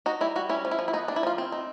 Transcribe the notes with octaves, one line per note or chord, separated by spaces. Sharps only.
D#4 F#4
G3 E4
G3 F#4
C#4 E4
F3
E4
F3
E4
B3 D#4
D4
E4
F3 F4
C4
D#4